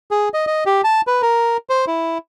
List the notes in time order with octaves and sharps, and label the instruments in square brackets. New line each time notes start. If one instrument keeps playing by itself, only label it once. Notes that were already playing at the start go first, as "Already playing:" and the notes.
[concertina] G#4
D#5
D#5
G4
A5
B4
A#4
C5
E4